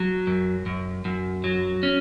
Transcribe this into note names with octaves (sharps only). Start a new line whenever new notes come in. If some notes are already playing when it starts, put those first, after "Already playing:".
Already playing: F#3
F#2
F#2
F#2
F#3
C#4